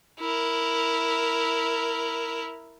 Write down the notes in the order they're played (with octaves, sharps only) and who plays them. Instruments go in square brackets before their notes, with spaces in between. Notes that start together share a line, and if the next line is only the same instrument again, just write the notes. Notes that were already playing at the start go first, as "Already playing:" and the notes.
[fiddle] E4 A#4